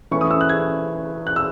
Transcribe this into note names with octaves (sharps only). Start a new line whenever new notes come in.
E3 A3 C#4 C#6
D#6
E6
F#6
G#6
F#6
E6